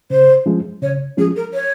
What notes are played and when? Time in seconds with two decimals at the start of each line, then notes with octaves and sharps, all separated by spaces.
0.10 C#3 C5
0.46 F3 G#3 C#4
0.81 C#3 C#5
1.17 F3 G#3 C#4 G#4
1.36 A#4
1.53 C#5